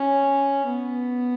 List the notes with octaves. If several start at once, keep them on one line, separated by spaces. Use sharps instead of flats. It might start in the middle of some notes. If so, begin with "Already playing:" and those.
Already playing: C#4
B3